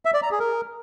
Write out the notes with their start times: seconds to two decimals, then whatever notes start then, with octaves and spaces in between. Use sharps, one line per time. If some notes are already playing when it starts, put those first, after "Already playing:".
0.05 E5
0.14 D5
0.22 A#5
0.31 G#4
0.40 A#4